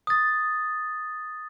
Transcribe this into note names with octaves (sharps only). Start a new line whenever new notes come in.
D#6 A6